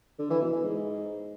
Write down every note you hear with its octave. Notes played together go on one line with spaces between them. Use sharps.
D3
E3
B2
E3
G#2